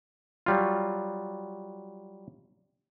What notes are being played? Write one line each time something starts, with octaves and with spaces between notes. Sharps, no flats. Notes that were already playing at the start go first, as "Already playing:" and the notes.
F#3 G3 F4